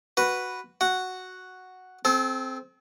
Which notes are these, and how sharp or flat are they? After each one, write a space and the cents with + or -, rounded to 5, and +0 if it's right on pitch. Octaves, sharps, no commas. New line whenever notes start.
F#4 +0 B4 +0
F#4 +0 F#5 +0
C4 +0 A4 -40